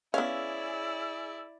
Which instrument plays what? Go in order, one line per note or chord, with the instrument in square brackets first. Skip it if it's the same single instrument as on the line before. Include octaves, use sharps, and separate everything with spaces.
[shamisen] B3 F5 [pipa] C#4 [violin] E4 D5 [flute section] G#4 E6